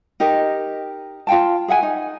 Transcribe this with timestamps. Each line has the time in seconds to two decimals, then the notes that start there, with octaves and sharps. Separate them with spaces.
0.20 D#4 G4 A#4 D#5
1.27 F4 F5 G5 A5
1.68 G#4 E5 F#5 G#5
1.83 D#4